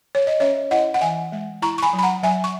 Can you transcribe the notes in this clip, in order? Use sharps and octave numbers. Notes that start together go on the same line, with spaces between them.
C#5
D#5
C#4 C#5 E5
E4 D#5 F#5
F#5
E3 E5 G#5
G#3
E4 A#5 C#6
C#6
G#5 B5
F#3
B5
F#5 A#5
F#3 E5 G#5
C#6